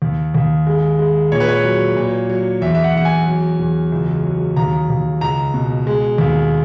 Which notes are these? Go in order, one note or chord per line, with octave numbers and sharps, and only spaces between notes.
D#2
D#2
G#3
G#3
A#2 C#5
B4
C#5
F#3
A#2
F#3
E2 E5
E5
F#5
E2 F#5
G#5
F#3
E2
C#2
F#3
D#2 A#5
D#2
C#2 A#5
B2
G#3
D#2